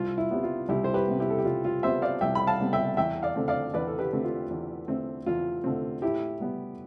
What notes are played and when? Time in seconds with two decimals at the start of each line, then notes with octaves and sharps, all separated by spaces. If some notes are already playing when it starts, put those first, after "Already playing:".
Already playing: C2 F4
0.18 E4
0.31 C3 G3 B3
0.43 F4
0.69 C2 E4 G4
0.84 C5
0.94 G4 B4
1.08 C3 G3 B3
1.20 E4 G4
1.30 A4
1.38 G4
1.45 C2 F4
1.65 F4
1.83 C3 G3 B3 C5 E5
2.02 D5 F5
2.21 C2 E5 G5
2.35 B5
2.47 F5 A5
2.60 C3 G3 B3
2.73 E5 G5
2.97 E2 E5 G5
3.22 D5 F5
3.36 D3 A3 C4
3.48 D5 F5
3.74 E2 B4 D5
3.87 A4
3.99 G4 B4
4.13 D3 A3 C4
4.24 F4
4.50 E2
4.88 D3 A3 C4
5.26 E2 F4
5.64 D3 A3 C4
6.02 A2 E4 G4
6.40 G3 B3